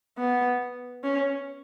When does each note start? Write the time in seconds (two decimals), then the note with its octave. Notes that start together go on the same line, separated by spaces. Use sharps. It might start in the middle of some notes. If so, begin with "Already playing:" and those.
0.18 B3
1.04 C#4